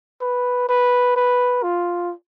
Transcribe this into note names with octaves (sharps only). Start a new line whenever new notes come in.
B4
B4
B4
F4